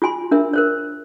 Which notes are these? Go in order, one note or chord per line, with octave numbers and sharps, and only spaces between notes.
F4 F#4 G#5 C6
D4 F4 A#4 E5
A#4 C5 C#5